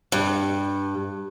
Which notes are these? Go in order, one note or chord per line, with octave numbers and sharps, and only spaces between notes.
G2